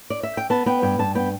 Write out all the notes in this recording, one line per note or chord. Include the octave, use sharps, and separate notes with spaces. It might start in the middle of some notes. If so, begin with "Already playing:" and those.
D5
E5
G5
B3 A5
B3 G5
G2 G5
G2 A5
B3 G5